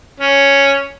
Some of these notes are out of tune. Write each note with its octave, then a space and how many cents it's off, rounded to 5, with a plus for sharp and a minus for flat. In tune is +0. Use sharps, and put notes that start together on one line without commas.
C#4 +0